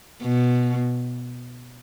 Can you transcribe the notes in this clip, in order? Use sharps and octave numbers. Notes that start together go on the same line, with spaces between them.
B2